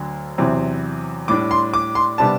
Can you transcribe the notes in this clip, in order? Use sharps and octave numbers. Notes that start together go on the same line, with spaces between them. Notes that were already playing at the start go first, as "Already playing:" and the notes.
Already playing: D2 D3 F#3
E2 C3 F#3 C4 E4
A2 G3 D4 D6
C6
D6
C6
C3 G3 B3 D4 A5